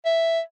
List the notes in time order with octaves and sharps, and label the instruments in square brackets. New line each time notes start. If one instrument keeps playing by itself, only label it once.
[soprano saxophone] E5